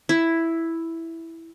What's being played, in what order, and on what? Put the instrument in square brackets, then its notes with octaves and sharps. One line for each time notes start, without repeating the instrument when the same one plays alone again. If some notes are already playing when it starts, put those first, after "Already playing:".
[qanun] E4